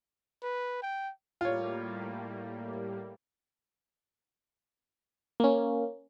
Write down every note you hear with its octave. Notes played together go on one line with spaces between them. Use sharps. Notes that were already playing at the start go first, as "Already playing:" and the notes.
B4
G5
A2 G3 A#3 F4 C#5
A#3 C#4